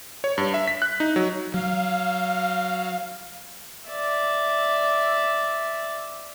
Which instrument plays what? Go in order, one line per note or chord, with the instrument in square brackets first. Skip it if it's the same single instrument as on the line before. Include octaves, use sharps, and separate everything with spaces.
[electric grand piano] C#5
G2
E5
B6
F#6
D#4
F#3
[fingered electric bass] F#3 [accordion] F5
[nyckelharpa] D5 E5